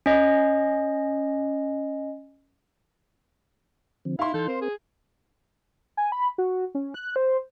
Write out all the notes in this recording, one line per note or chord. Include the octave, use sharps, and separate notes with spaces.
C#4 D#5
D3 F3 C4
D#4 E4 F5 C6
E3 D#4 A4 G6
C4 A#4 C5
G#4
G#5
B5
F#4
C#4
F#6
C5